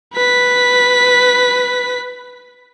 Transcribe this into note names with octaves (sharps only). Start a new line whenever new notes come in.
B4 B6